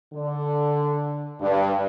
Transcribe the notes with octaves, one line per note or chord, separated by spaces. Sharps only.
D3
G2